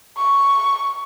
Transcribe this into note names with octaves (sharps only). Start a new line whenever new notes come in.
C#6